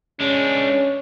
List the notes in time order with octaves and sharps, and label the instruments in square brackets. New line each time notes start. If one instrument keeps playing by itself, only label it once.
[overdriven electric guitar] G#3 D4 [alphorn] C#4